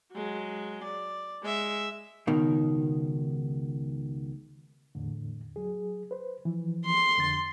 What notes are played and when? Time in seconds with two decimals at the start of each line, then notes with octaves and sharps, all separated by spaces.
0.12 F#3 G#3
0.84 D5
1.43 G#3 E5
2.27 C#2 B2 D#3
4.95 E2 A2 D3
5.56 F#3 G#4
6.11 B4 C5
6.45 E3 F3
6.87 C6
7.18 F2 D3 A6